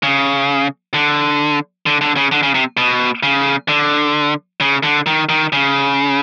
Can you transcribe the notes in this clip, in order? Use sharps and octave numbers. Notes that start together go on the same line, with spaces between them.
C#3
D3
D3
D3
C#3
D3
C#3
C3
B2
C#3
D3
C#3
D3
D#3
D#3
C#3